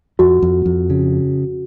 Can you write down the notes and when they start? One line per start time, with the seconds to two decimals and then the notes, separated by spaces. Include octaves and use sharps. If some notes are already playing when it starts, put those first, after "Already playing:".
0.19 F2 F#4
0.42 F2
0.66 F2
0.90 C#3